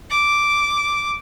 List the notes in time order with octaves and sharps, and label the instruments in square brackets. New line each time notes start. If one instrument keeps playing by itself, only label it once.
[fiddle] D6